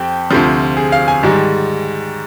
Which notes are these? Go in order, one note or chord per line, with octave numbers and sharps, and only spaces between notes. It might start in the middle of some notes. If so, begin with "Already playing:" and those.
Already playing: F2 C4 G4
D2 C3 F3
G#4
F5
G#5
G#2 D#3 G3